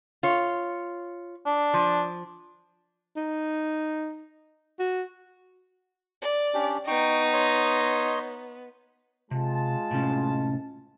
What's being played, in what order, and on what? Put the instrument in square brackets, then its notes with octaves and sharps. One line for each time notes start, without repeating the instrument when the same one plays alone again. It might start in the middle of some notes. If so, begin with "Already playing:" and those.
[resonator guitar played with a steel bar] F4 C#5
[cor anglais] D4
[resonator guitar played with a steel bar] F3
[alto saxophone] D#4
F#4
[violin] D5
[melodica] C#4 D4 G4
[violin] B3 [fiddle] D#4 [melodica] G5 C#6
[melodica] C#5 D#5 C6
[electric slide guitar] C3 [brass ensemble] G#3 F4 A5
[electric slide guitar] A2 C3 C#4